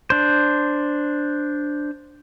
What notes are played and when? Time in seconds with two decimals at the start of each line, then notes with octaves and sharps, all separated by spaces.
0.10 D4 C5